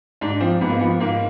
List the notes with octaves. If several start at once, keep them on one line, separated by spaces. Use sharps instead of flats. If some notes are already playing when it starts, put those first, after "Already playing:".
G#2 D4
F3 C4
G#2 B3
A#3
F3 B3
G#2 A#3